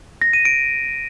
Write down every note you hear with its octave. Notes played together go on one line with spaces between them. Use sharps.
A#6
D#7
D7